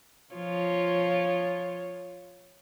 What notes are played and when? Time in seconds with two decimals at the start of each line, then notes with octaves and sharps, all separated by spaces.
0.34 F3 F4 C#5